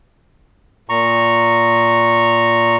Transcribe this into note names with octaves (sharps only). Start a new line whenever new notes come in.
A#2 A#5 C#6